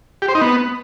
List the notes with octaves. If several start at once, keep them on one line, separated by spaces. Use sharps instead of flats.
G4
C5
D#4
B3